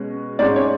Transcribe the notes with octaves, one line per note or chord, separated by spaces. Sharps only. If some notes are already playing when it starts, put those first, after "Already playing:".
Already playing: B2 G#3 C#4
G#2 G#3 C#4 D5
C#5